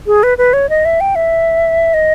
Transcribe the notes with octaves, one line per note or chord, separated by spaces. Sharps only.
G#4
B4
B4
C#5
D#5
E5
G5
E5
D#5